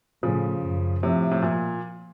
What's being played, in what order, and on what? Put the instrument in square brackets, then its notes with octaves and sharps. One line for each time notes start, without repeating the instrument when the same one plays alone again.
[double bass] A2 [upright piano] C#3 F3
[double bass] F#2
[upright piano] A2 C3 [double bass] F3
[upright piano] A2
A#2